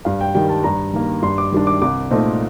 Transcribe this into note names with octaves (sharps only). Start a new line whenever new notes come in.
G2 F5
G5
D#3 G3 G5
A5
G2 A#5
D#3 A#3
G2 C6
D6
D#3 G3 D4
D6
C2 D6
A#2 A3 C4 D#4